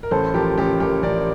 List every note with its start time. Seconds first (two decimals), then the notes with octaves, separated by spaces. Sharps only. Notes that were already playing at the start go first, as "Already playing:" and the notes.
0.03 A#4
0.11 A1 A4 C5
0.34 F3 G4 A#4
0.57 A1 G4 A#4
0.80 A1 G4 A#4
1.02 A1 A#4 D5